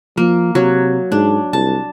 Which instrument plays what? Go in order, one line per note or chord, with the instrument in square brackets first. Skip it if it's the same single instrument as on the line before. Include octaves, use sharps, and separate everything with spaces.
[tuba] F3 [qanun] A#3
[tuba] C3 [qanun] F#3
[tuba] G#2 [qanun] D4
[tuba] C2 [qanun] A5